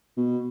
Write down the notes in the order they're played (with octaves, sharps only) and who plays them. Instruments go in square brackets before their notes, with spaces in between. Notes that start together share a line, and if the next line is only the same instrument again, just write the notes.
[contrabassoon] B2